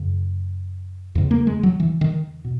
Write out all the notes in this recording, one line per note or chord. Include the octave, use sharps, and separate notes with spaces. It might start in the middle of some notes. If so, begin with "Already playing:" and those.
Already playing: F#2 C#3
E2 C#3
A#3
G#3
F#3
E3
D#3
B2